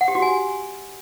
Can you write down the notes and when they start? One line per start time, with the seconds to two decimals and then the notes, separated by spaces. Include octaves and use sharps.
0.01 F#5
0.08 G4
0.15 F#4
0.22 G#5